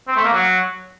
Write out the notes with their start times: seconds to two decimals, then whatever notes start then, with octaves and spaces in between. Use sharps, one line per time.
0.08 C4
0.16 A3
0.24 A#3
0.33 F#3